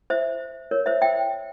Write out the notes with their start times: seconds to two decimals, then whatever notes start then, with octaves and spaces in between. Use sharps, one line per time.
0.10 C5 E5
0.71 A#4 C#5
0.86 C5 E5
1.01 E5 G5